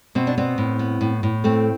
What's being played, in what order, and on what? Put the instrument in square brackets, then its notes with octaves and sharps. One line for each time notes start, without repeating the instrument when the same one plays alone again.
[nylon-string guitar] B2 C4
D4
B3 C4
A2
B3
A2
A2
A3 C4